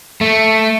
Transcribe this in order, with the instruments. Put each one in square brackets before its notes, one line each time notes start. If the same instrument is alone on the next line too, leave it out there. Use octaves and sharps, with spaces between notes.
[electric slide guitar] A3